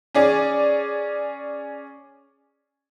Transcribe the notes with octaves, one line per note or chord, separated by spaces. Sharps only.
C#4 G#4 D5